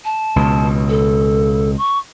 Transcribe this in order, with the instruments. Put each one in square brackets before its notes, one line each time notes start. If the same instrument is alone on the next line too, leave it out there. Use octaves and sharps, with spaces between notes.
[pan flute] A5
[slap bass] C#2 B2
[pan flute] A4
C#6